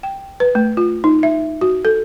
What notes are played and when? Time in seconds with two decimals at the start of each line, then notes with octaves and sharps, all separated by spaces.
0.03 G5
0.40 B4
0.55 A3
0.77 F4
1.04 D#4
1.23 E5
1.61 F#4
1.85 A4